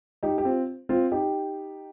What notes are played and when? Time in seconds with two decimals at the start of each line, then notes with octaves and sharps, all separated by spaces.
0.23 D#4 G4
0.38 G4
0.45 C4 F4
0.89 C4 F4
1.11 D#4 G4